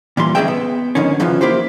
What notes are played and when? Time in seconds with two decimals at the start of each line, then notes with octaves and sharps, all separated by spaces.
0.17 A#2 E3 G3 C6
0.35 G#2 C#3 E3 G#4 E5 G5
0.48 B3
0.95 F2 G#2 D3 D#3 C#4
1.20 F#2 C#3 E3 F3
1.41 A#3 E4 G4 C5